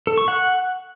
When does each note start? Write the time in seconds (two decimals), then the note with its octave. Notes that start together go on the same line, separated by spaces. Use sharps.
0.07 A4
0.18 C#6
0.28 F#5